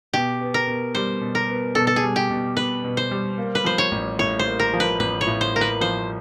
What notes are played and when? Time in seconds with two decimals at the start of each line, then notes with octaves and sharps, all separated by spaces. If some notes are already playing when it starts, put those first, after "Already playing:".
0.13 B2 G4
0.41 B3
0.54 A#4
0.67 B2
0.95 G3 C5
1.21 B2
1.35 A#4
1.49 B3
1.75 B2 A4
1.87 A4
1.96 G#4
2.03 G3
2.16 G4
2.30 B2
2.57 B3 B4
2.84 B2
2.97 C5
3.11 G3
3.38 A#3
3.55 B4
3.64 F3 C5
3.78 C#5
3.91 A1
4.19 A2 C#5
4.39 C5
4.46 A#3
4.59 A#4
4.73 F3
4.80 B4
4.99 A1 B4
5.21 C#5
5.26 A2
5.41 C5
5.54 A#3 A#4
5.61 B4
5.81 F3 C5